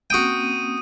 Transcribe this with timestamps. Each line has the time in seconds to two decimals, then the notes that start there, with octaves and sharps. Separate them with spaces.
0.10 A#3 C4 C#4 F#4 G5 D#6 D#7